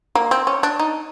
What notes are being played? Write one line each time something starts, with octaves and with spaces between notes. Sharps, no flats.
A#3
C4
C#4
D4
D#4